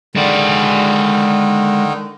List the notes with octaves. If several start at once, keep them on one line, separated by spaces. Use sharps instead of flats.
D3 D#3 G#3 D5